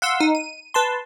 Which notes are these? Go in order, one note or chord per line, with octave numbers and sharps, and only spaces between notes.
F5 F#5 C6 E6
D#4
D#7
B4 A5 C6